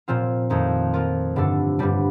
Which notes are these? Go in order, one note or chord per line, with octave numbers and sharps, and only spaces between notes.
A#2 F3 C4 F4
F2 D#3 A3 D#4
F3 A#3 F4 A#4
G2 D3 A3 D4 A4
G2 D3 G3 D4